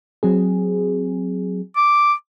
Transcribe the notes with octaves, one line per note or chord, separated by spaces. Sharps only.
F#3 C4 G#4
D6